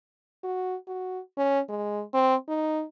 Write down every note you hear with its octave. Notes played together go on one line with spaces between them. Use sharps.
F#4
F#4
C#4
G#3
C4
D#4